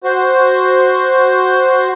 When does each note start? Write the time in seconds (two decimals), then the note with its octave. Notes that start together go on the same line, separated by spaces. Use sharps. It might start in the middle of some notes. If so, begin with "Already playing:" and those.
0.04 F#4 C5